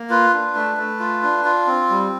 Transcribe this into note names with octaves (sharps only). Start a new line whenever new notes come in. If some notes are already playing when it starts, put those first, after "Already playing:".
Already playing: A#3
F4 B4
D4
A3
A3
F4
D4
F4
C4
G3